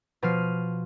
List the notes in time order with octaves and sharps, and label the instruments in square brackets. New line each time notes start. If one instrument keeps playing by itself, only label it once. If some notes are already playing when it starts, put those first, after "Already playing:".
[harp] B2 F3 F6 C7 D#7